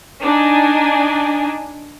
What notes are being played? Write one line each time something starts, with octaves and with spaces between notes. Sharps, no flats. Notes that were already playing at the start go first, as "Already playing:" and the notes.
D4 D#4 G#5